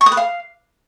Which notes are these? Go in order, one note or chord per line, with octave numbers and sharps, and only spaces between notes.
C#6
D#6
B4
F5